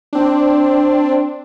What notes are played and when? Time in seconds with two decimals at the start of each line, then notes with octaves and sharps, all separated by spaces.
0.13 C4 D4